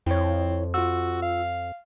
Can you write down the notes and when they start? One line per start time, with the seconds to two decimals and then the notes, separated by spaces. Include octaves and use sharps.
0.07 F2 C4 E4 C#5
0.74 F4 F#4 E6
1.22 F5